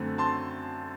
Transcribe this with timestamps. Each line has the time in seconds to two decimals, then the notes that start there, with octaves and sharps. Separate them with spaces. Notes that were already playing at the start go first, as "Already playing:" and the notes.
Already playing: F#2 D3 A3 C4
0.18 A5 C6